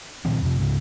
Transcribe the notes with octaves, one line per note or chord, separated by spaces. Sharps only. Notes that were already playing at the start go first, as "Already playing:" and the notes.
A#2 D#3 F3 C4
F2 C3
C#2 G#2 C#3